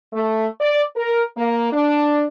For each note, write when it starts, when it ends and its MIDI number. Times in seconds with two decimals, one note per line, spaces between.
0.12 0.47 57
0.60 0.82 74
0.96 1.23 70
1.37 1.70 58
1.73 2.25 62